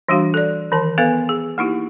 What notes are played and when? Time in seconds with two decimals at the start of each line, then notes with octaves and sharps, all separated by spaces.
0.08 E3 G3 D4 F#4 F5
0.34 A4 D5
0.72 D#3 E3 A5
0.98 B3 A4 B4 F5 G#5
1.29 G#4
1.58 A#3 D#4 E4 G4